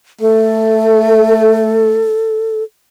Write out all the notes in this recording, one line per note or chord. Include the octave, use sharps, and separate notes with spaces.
A3 A4